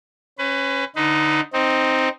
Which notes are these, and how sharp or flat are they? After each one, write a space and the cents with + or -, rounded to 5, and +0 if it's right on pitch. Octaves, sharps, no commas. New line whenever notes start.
C#4 -15 B4 +25
D3 +0 D#4 +0 B4 +40
C4 +0 D#4 +0